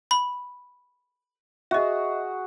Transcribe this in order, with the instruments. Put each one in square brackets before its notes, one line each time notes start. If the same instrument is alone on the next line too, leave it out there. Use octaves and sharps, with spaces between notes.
[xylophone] B5
[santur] F#4 G#4 [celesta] D#5 E5